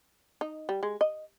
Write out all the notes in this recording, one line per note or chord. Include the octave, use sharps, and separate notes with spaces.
D#4
G3
G#3
D#5